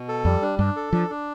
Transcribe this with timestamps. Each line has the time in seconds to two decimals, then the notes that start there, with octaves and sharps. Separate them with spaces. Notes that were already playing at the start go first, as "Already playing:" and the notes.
Already playing: B2
0.08 A4
0.25 F2 G3
0.42 D4
0.59 G2 D4
0.76 A4
0.93 F3 D4
1.10 D4